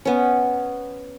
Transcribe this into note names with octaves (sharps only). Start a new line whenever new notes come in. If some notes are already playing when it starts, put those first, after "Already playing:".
B3 C#4